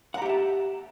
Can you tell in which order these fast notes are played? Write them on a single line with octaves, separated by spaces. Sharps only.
F#5 A#5 G4 E5 A5